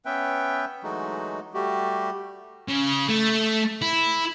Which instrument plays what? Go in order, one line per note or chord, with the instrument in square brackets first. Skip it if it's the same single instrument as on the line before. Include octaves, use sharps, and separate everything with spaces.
[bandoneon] B3 C#4 B4 E5 G5
E3 F#3 G#3 A3 D#4 F#4
G3 A3 F#4 G4
[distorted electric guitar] C#3
A3
E4